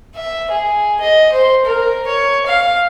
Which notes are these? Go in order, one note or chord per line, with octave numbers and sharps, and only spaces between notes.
E5
G#4
D#5
C5
A#4
C#5
F5